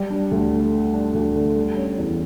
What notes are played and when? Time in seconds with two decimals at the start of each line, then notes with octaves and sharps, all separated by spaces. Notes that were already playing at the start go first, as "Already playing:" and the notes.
Already playing: G3
0.10 D4
0.31 D2
0.53 D3
0.73 G3
0.94 D4
1.14 D2
1.36 D3
1.56 G3
1.77 C#4
1.98 E2